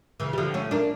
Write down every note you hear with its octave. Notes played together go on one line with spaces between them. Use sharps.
C#3 E3
G3
D3 F3
A3 C#4
A#3 D4